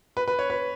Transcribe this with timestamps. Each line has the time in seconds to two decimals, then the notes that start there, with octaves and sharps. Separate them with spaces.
0.17 B4
0.28 B4
0.39 C#5
0.50 B4